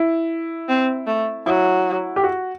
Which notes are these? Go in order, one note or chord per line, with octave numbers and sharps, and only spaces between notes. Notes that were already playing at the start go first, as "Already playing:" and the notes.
Already playing: E4
C4
A3
F#3 E4
G4
F#4